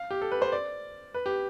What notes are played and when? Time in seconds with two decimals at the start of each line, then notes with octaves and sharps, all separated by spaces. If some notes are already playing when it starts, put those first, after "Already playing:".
Already playing: F5
0.11 G4
0.22 A4
0.31 B4
0.42 C5
0.52 D5
1.14 B4
1.26 G4